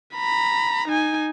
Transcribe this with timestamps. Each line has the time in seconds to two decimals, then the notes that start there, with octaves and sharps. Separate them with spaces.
0.16 A#5 B5
0.88 D#4 G#5